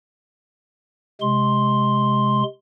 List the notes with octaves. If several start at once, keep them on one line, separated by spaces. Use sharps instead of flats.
C3 G#3 C6